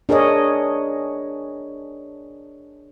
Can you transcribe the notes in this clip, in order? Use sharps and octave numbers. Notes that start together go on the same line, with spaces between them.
D4 G#4 A#4 C#5 D#5